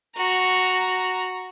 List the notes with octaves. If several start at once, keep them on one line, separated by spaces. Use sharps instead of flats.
F#4 A#5